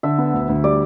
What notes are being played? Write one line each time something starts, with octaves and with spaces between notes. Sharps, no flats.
D3 E5
B3
D2
D2
G3 D5